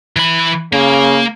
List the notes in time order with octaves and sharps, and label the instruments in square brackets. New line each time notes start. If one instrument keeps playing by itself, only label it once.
[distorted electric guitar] E3 B5
[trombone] C#3 [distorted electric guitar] A#3